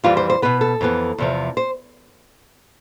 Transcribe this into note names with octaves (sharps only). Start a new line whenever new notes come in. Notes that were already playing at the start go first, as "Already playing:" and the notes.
F2 E3 G3 F4
C5
C5
B2 B3 B4
A4
F2 E3 B3
E2 C3 F3
C5